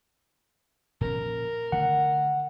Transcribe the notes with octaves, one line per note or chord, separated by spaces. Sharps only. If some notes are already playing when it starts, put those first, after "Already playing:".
A#2 F3 C#4 A#4
D3 D#3 A3 F#5